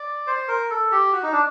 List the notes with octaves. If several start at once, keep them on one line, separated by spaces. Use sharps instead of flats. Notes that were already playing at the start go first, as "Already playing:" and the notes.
Already playing: D5
C5
A#4
A4
G4
F#4
D#4
D4